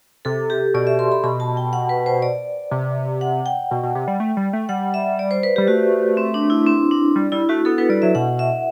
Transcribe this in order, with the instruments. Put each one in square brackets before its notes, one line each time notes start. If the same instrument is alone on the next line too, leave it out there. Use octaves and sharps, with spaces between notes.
[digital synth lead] C3 [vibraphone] A4
[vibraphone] G4
[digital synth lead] B2 [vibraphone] D5
[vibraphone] E5
C6
B5
[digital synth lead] B2 [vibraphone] B5
[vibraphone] A5
G5
F#5
B4
C5
D5
[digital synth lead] C3
[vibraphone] F#5
G5
[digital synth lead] B2
B2
C3
G3
A3
G3
A3
[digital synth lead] G3 [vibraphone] F#5
[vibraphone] E5
D5
C5
B4
[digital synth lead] G3 [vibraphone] G4
[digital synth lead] A3 [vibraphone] F#4
[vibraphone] C4
D4
E4
C4
D4
[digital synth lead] G3
[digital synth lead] G3 [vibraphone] E4
[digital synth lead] A3 [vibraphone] F#4
[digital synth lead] B3 [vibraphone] A4
[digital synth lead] B3 [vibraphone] B4
[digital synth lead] G3 [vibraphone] D5
[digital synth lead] F#3 [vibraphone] E5
[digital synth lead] B2 [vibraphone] F#5
[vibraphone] E5